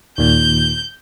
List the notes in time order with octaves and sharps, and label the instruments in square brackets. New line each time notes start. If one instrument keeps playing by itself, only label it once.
[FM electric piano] D#2 A#2 [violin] G6